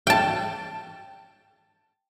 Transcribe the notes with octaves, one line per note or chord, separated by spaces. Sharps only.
G5 A5